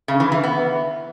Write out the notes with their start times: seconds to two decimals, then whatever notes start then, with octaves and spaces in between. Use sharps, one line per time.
0.08 C#3
0.20 E3
0.32 E3
0.44 B3